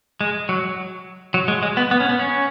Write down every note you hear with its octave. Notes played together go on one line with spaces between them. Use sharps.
G#3
F#3
F#3
G#3
G#3
B3
B3
C#4
B3
C#4